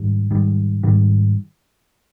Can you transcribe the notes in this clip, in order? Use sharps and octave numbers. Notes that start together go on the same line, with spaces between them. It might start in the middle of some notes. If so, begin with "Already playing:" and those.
Already playing: G#2 D#3 G3
G#2 D#3 G3
G#2 D#3 G3